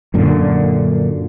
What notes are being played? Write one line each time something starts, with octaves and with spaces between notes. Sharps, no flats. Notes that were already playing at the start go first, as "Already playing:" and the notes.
F#2 A#2 D3